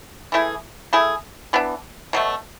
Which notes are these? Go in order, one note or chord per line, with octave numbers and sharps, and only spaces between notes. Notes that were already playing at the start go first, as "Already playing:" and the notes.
E3 A3 E4 G#4
A3 E4 G#4
E3 B3 D4
B2 F#3 A3